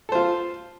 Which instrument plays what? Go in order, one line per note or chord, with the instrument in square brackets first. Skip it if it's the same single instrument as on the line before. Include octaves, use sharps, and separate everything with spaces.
[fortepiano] A4
C5
F4